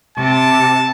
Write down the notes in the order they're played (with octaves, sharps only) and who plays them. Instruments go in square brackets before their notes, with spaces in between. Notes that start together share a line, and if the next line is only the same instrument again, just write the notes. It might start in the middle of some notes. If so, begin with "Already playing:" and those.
[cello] C3 [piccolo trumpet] A5